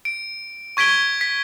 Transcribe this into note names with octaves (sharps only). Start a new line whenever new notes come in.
D7
C#6 G#6 B6 D7 G7
B6